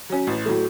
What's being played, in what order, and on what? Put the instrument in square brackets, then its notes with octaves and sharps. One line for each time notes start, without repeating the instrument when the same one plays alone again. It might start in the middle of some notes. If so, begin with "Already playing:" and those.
[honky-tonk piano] F#3 C#4
A1
A2 F#3 A3